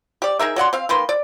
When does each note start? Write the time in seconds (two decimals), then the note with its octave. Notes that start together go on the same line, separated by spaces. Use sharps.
0.22 G4 D5
0.39 D#4 G#4 A#4 E5
0.56 F#3 D5 F#5 C6
0.73 C4 F5
0.89 D#3 A#3 B4 C6
1.09 D5